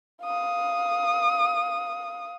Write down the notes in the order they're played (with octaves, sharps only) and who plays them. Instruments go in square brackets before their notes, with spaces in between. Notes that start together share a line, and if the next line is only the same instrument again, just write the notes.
[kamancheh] F5 D#6